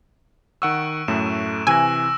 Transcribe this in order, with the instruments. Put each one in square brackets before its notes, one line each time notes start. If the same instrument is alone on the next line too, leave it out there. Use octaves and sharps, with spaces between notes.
[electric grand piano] D#3 F#5 E6 [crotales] C#6 F#6 D7
[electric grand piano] F#2 A2 A3 [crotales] E7
[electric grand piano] C3 E3 [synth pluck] G#5 [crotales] E6 F#6 A#6